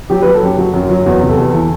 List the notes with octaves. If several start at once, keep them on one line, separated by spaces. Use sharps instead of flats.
F#3 G4
B4
F#3
A4
F#2 G4
F#3 F#4
F#2
F#3
E2 F#4
C3
A4
E2
E3